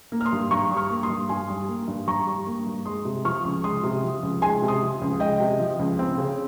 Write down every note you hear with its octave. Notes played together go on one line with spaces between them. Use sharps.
A#3
F6
C6 D#6
G2
G2 A#5 C#6
G3
C#6 F6
A#3
C6 D#6
G2
G2 G#5 C6
G3
A#3
G2
G2 A#5 C#6
G3
A#3
G2
G#3 C6 D#6
C3
F3 C#6 F6
C#2
G#3 C6 D#6
C3
F3
C#2
G#3 G#5 C6
C3
C6 D#6
F3
C#2
G#3 D#5 G5
C3
F3
C#2
C4
C#3